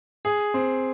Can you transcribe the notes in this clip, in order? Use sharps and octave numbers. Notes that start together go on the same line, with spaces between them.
G#4
C4